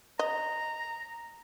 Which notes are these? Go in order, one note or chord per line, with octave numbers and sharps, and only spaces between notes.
D#5 A#5